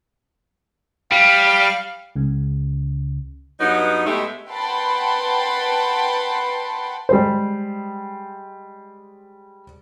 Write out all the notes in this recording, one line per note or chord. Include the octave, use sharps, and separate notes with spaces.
G3 F5
C#2 C#3
G2 F#3 B3 D#4
B2 G#3 A3 G4 E5
B4 F#5 G5 A5 B5 C6
G3 G#3 C5